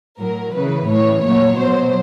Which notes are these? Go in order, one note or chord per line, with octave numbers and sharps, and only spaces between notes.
A2 F#3 A#4
C#3 E3 B4
A2 E3 C#5
A#2 F#3 C#5
B2 F#3 C5